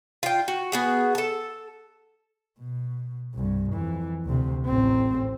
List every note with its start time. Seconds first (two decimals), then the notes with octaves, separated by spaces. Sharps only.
0.23 F4 G5
0.48 F#4
0.72 B3 F#4 G#4
1.15 A4 A5
2.60 B2
3.34 C2 G2
3.73 F2 E3
4.25 D2 C3
4.65 A1 C4